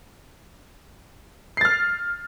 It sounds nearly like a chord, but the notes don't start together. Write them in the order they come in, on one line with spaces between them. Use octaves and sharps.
C7 A6 F6